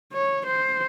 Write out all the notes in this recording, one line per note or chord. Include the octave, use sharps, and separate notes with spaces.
C#5
C5